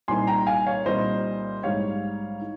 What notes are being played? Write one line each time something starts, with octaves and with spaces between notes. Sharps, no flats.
C2 A#2 G3 C4 D#4 G#5 C6
G5 A#5
F5 G#5
C#5 F5
C2 A#2 G3 C4 D#4 C5 D#5
A#1 G#2 G3 C4 D#4 C#5 F5
D#4